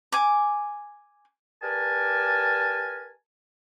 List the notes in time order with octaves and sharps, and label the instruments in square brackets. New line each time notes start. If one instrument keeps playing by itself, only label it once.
[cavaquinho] G#5 D6
[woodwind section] G4 A#4 B4 D5 G#5 A5